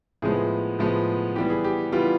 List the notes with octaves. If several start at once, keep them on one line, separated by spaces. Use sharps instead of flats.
A2 F3 G#3 B3 G#4
A2 F3 G#3 B3
E3 G3 B3 G4
G#4
G4
E3 G3 B3 F4